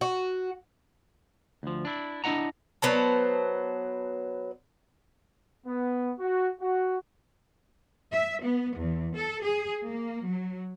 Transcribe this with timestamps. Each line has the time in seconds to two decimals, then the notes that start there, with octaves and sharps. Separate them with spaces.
0.01 F#4
1.63 D2 F3
1.85 D4 E4
2.24 D4 E4 D#5 F#5 A#5
2.82 F#3 B3 C5 A5
5.66 B3
6.20 F#4
6.61 F#4
8.13 E5
8.45 B3
8.79 E2
9.16 A4
9.44 G#4
9.87 A#3
10.27 F#3